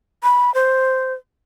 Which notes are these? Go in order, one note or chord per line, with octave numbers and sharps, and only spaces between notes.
B5
C5